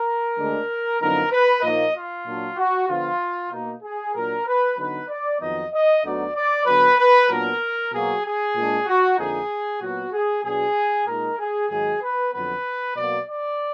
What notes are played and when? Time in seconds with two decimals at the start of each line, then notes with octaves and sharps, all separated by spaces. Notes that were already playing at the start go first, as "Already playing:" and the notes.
Already playing: A#4
0.36 D2 D3 G#3 D4
1.00 F#2 D3 F3 B3 D#4 A#4
1.32 B4
1.62 A#2 F3 A#3 D#4 D#5
1.94 F4
2.25 A#2 F#3 D4
2.57 F#4
2.88 D3 F3 B3 F4
3.51 B2 A#3 D#4
3.83 G#4
4.14 A#2 F#3 D4 A#4
4.46 B4
4.77 D3 F#3 B3 D#4 B4
5.09 D5
5.40 F2 D#3 F#3 B3 D#4 D#5
5.72 D#5
6.03 D2 D3 F#3 B3 D#4 D5
6.34 D5
6.66 D3 F#3 B3 B4
6.98 B4
7.29 A#2 F#3 B3 D4 A#4
7.92 B2 F#3 A#3 G#4
8.24 G#4
8.55 A#2 G#3 D4
8.87 F#4
9.17 F2 D3 F3 A#3 D#4 G#4
9.81 A#2 F#3 B3 F#4
10.13 G#4
10.44 B2 F#3 D4 G#4
11.07 A#2 G#3 D#4 A#4
11.38 G#4
11.69 G#2 D#3 F#3 G#4
12.01 B4
12.32 F2 D3 F#3 B3 B4
12.95 B2 F#3 A#3 D5
13.27 D5